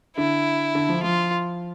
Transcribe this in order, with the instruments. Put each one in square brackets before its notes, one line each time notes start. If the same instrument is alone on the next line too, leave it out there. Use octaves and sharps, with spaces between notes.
[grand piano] D3 [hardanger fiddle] E4
[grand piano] D3
F3
[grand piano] F3 [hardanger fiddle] F4